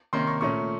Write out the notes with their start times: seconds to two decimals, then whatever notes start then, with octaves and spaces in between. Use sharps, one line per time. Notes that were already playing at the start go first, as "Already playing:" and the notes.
0.13 C3 D#3 A#3 C#4 C6
0.27 C#6
0.41 A#2 A3 C#4 C#6